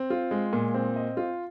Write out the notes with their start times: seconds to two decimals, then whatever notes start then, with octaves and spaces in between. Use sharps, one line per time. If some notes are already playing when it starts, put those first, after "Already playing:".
Already playing: C4
0.10 F4
0.31 G#3
0.53 A#2
0.74 C4
0.96 D#5
1.17 F4